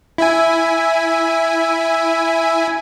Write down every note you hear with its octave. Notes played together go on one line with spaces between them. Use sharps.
E4 E5 G#5